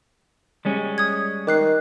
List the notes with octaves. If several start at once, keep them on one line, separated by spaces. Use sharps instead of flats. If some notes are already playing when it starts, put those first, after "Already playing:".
G3 G#3 C#4
D#6 G#6
D#3 D6 F#6 C7